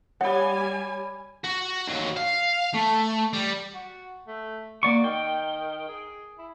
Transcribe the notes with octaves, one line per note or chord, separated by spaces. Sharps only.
G3 C#5 F#5 G#5 B5
F#4
D#2 F#3
F5
A3
G3
F#4
A3
A#3 F#4 D5 C#6
D#3 G5
G#4
E4